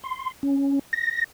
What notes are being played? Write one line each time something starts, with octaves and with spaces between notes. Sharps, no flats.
C6
C#4
A#6